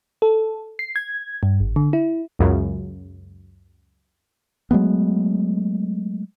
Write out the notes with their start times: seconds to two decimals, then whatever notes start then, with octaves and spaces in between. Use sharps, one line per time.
0.22 A4
0.79 C7
0.96 G#6
1.43 G2
1.60 G#1
1.76 D3
1.93 E4
2.39 C#2 F#2 C#3
4.71 F#3 G#3 A3 B3